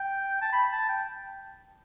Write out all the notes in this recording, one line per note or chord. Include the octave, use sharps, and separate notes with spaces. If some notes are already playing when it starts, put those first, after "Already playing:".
Already playing: G5
A5
B5
A5
G5